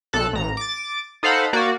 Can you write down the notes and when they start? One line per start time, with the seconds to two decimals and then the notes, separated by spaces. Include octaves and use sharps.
0.13 B1 A4 F#6
0.33 A1 A#5
0.57 D6 A6
1.23 D#4 A4 C5 F5 F#5 B5
1.53 A#3 F#4 D5